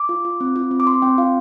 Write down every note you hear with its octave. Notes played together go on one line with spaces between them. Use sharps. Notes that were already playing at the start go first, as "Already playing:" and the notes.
Already playing: D6
F4
F4
C4
F4
C4
D6
C4 C6
C4 G5
F4 F5